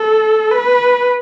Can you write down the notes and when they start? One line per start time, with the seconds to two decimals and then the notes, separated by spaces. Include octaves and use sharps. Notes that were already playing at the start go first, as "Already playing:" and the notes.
Already playing: A4
0.52 B4